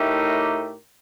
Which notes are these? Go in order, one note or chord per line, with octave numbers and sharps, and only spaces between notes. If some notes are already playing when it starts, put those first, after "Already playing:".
Already playing: A2 A3 D#4 G4 A#4